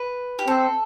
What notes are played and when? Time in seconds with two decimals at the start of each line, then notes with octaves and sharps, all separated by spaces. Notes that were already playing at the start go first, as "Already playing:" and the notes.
Already playing: B4
0.39 G4
0.47 C4 A4